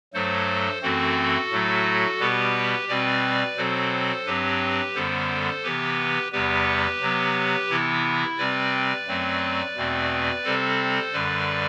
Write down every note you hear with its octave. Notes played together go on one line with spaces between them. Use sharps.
G2 F#3 A3 A4 C5
F#2 E3 A3 C4 F#4 A4
A2 F#3 A3
B2 G3 B3 G4 B4
B2 G3 C4 B4 D5
B2 F#3 C4 A4 C5
G2 F#3 C4 G4 B4
F#2 D3 G3 B3 A4 C5
C3 E3 B3 G4 B4
E2 C3 G3 B3 G4 B4
C3 F#3 B3
C3 E3 B3 E4
C3 G3 C4 B4 D5
F#2 F#3 A3 C4
E2 B2 A3 C4
C3 G3 C4 A4 C5
F#2 D3 G3 B4 D5